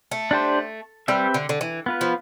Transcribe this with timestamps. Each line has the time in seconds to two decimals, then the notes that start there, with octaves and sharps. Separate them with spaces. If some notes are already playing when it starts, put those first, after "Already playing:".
0.11 A3
0.31 D4 G4 C5
1.08 G3 C4 G4 B4 E5
1.34 D3
1.49 D3
1.61 E3
1.86 B3 F4 B4
2.01 F3